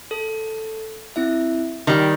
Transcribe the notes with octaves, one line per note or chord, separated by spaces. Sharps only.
A4
C4 E4 E5
D#3 G3 D#5